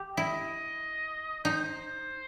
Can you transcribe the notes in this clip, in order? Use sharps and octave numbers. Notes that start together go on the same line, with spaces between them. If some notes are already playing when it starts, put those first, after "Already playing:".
Already playing: G4
E4 D#5
D#4 C5